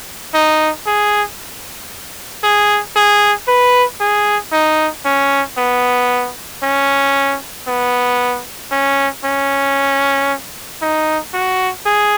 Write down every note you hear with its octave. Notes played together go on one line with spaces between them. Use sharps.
D#4
G#4
G#4
G#4
B4
G#4
D#4
C#4
B3
C#4
B3
C#4
C#4
D#4
F#4
G#4